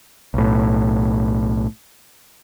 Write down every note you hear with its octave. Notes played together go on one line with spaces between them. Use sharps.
B1 A2